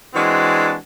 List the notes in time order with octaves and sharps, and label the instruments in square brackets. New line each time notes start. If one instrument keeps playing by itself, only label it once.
[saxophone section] E3 G#3 C4 D4 F#4